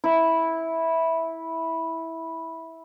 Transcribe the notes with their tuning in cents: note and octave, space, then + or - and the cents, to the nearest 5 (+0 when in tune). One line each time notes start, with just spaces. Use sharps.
E4 -10